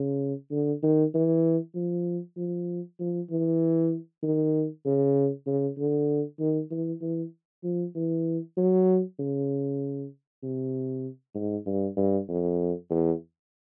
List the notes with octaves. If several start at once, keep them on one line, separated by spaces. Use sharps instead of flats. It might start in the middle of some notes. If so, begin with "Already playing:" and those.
Already playing: C#3
D3
D#3
E3
F3
F3
F3
E3
D#3
C#3
C#3
D3
D#3
E3
E3
F3
E3
F#3
C#3
C3
G#2
G2
G2
F2
E2